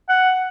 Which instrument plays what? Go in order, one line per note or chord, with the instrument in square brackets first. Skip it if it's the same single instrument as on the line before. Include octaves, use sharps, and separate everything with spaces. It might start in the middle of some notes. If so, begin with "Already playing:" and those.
[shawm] F#5